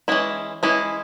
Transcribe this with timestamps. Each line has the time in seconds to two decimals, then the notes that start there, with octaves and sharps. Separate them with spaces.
0.08 E3 G#3 C#4 E4
0.63 E3 G#3 C#4 E4